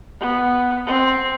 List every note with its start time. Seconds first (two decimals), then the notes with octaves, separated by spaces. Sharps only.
0.20 B3
0.87 C4